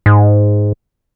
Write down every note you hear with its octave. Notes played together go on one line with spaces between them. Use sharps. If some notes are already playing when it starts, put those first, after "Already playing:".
G#2